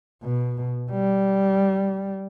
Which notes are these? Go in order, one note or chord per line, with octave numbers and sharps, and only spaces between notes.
B2
G3